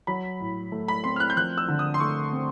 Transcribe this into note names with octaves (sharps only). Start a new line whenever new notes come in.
F#3 B5
A2
A3
B5
C4 C6
F6
F#6
G6
F3 F#6
E6
D3
D#6
C6
A3 C#6
C4